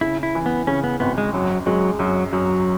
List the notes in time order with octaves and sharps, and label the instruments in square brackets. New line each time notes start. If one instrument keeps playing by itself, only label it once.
[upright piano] C#3 [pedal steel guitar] E4
[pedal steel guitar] E4
[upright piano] E3
[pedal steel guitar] B3
[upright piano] C#3 [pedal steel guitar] C#4
[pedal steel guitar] B3
[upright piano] G#1 [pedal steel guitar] B3
[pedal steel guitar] G#3
[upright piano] F#2 [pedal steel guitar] F#3
[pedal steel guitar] F#3 [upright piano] G#3
[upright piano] F#2 [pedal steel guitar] F#3
[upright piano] F#2 [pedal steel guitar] F#3